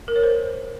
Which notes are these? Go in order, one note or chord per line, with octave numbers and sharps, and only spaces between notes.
A#4
C#5
C5